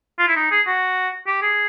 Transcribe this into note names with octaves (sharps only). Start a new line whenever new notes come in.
F4
E4
D#4
G#4
F#4
G4
G#4